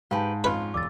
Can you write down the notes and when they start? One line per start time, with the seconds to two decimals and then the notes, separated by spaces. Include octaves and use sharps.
0.11 G#2 G4 B4 F5 G#5 A5
0.44 F2 C#4 F4 B4
0.74 E1 D6 E6 A6